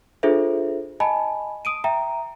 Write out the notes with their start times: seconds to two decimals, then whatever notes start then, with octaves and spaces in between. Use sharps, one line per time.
0.23 D4 F4 G#4 A4 C5 E5
1.00 D#5 G#5 A5 B5
1.65 D#6 D7 D#7
1.84 E5 G5 A#5